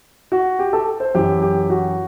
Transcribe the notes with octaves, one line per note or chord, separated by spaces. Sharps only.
F#4
G4
A4
C5
F#2 E3 G4
G4
F#4